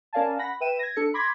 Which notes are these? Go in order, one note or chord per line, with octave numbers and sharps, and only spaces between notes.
C#4 A#4 D5 F5 G#5 A5
F#5 B5 A#6
B4 E5 G5 D#7 E7
G#6 A#6
D4 A4 C#7
B5 C6 D6 G#6 A#6 B6